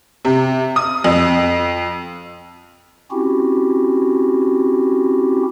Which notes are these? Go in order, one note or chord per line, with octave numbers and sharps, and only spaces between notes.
C3
D#6
F2
C4 C#4 E4 F#4 G4